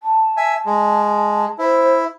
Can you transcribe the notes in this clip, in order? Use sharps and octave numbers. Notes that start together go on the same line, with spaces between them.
A5
E5 G#5
G#3
E4 C5